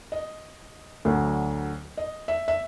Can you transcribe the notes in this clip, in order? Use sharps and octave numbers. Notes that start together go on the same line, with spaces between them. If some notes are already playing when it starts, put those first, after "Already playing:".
D#5
D2 D3 F#3
D#5
E5
E5